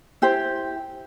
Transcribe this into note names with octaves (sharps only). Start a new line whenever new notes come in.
E4 G4 C5